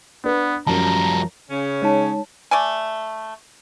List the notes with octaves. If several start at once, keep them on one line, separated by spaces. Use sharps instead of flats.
B3 D4 B4
F#2 F3 G3 F#4 A5 A#5
C#3 C#4
G#3 D#4 C#5 A5
A3 D5 G#5